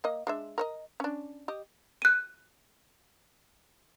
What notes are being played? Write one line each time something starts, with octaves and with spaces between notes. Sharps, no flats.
A#3 D#5
G#3 D4 E5
A#4 C#5 D#5
C#4 D4
G4 D#5
F#6 D#7